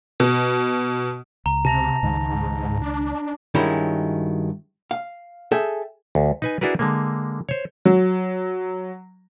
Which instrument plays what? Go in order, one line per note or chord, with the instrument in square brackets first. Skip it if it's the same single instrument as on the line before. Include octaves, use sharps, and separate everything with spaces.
[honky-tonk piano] B2
[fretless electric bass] C#2 [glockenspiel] A#5
[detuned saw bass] C3 [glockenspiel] A5 A#6 F7
[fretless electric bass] C#2 D#3 [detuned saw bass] G#2
[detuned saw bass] D4
[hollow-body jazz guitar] G2 D#3 F#3 G#3 C#4 E4
F5
G#4 A4 E5 G5
[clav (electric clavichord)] D2
D#4 B4 G#5
D4 E4 F#4 G#4 A#4 B4
D3 G#3 A#3
C5 C#5
[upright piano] F#3